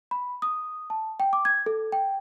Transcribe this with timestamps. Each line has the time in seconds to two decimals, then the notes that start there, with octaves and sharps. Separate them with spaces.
0.11 B5
0.42 D#6
0.90 A5
1.20 G5
1.33 D6
1.45 G#6
1.66 A4
1.92 G5